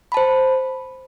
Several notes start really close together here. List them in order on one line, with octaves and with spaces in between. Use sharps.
B5 A5 C5